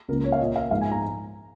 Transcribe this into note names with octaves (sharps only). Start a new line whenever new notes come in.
C#2 C#3 A#3 A#4
C#5
F5
A#2 A#3 D#5
F5
G#2 F3 G#3 F5
G#5
A#5